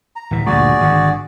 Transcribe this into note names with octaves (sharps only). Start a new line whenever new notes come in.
A#5
D1 E3
D2 G2 A#2 F#4 G#4 D5
G#1 D3